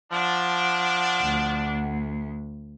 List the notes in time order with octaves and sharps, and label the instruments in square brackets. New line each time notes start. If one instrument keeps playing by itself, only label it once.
[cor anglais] F3 [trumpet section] D4 [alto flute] F#5
[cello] D2